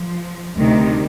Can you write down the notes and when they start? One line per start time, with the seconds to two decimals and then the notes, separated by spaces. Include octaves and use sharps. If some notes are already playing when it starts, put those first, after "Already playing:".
Already playing: F3
0.56 D2 C3 D#3 G3